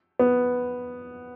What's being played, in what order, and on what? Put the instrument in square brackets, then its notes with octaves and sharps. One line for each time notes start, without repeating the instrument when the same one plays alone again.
[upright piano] B3